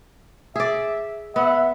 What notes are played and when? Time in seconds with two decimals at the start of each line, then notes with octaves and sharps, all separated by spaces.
0.56 G#4 D5 E5
1.36 B3 E5 F#5